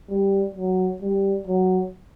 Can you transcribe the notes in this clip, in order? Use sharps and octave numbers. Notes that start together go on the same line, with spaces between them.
G3
F#3
G3
F#3